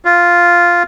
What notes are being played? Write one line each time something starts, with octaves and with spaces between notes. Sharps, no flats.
F4